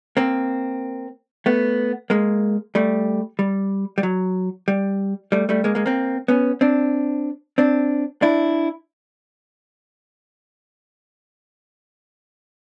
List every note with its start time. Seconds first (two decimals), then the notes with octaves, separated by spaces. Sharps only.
0.17 A#3 C4
1.46 A3 B3
2.10 G#3 A#3
2.75 G3 A3
3.39 G3
3.98 G3
4.03 F#3
4.68 G3
5.32 G3 A3
5.49 G3 A3
5.64 G#3 A#3
5.75 G#3 A#3
5.86 A#3 C4
6.28 B3 C#4
6.61 C4 D4
7.58 C4 D4
8.22 D4 E4